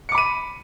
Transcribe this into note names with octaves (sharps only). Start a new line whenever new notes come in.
B5 D6 C#7 D#7